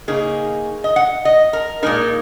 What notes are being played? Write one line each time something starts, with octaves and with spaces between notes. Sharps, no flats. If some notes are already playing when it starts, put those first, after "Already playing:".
C#3 A#3 D#4 G#4
D#5
F#5
D#5
A#4
A#2 G#3 D#4 A#4